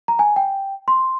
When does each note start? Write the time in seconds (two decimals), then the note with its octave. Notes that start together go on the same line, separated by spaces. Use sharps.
0.08 A#5
0.19 G#5
0.36 G5
0.88 C6